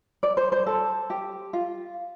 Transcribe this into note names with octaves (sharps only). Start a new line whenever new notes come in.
D5
C5
C5
A4
G4
F4